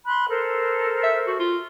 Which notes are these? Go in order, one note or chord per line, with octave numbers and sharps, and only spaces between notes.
B5 C6 F#6
A4 A#4 C5
E5
F#4
F4